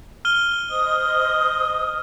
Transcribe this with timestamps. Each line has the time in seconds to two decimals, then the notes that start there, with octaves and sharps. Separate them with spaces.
0.25 F6 D#7 G7
0.70 C5 D#5 D#6